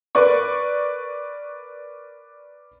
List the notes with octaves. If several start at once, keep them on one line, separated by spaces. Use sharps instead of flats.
A#4 B4 D5 C#6